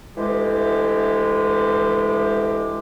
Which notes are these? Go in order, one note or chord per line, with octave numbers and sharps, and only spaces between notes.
D2 E3 G#3 G4